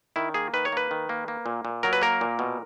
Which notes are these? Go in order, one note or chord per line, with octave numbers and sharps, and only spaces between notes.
D#3 E4
A#3 G#4
D#3 B4
C#5
A#3 B4
D#3
A#3
A#3
A#2
A#2
F#3 A#4
B4
A#3 A#4
A#2
B2